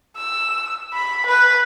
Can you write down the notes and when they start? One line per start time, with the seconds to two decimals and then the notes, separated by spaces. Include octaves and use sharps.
0.17 E6
0.94 B5
1.26 B4